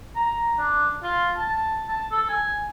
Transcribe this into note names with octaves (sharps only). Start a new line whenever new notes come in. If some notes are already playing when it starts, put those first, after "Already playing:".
A#5
D4
F4
A5
A5
A4
G#5